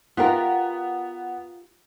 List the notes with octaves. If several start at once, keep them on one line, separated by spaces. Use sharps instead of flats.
B3 F4 G4 A#4